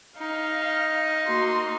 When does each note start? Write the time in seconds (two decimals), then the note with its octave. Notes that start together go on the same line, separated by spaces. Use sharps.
0.18 D#4 F5
1.26 A#3 F#4 C6